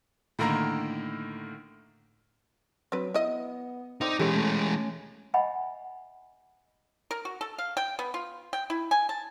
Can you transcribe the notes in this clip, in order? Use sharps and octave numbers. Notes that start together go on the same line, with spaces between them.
A2 D3 D#3 A#3 A#5 A#6
F#3 C4 D4 B4
B3 E4 D#5
D3 C4 D#4 D6
E3 G#3 C#4 G4 A4 C#5
A3
D#5 E5 F#5 G#5 B5
A#4
F#4
A4
F5
G5
B3
F4
G5
E4
G#5
A5